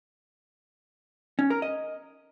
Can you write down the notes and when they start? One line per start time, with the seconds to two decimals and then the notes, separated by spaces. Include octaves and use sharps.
1.39 C#4
1.50 A#4
1.62 D#5